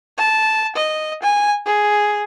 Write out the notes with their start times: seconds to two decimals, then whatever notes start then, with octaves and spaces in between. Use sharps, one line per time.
0.18 A5
0.76 D#5
1.23 G#5
1.66 G#4